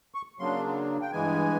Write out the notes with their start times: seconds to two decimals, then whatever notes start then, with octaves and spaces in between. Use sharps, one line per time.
0.15 C#6
0.39 C#3 F#3 A#3 D4 C6
1.01 G5
1.12 G2 E3 G#3 B3 G#5